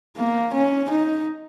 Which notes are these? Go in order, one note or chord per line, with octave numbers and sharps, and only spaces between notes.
A#3
C#4
D#4